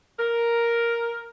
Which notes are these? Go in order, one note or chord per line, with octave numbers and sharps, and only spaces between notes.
A#4